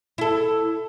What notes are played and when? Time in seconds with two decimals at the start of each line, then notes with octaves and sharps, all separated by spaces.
0.18 E4 A4